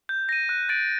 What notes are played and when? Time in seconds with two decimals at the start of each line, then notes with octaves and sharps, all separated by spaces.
0.09 G6
0.29 A#6 D#7
0.49 F#6
0.69 A6 D7